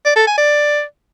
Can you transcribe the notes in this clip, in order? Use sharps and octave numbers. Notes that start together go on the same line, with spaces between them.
D5
A4
G#5
D5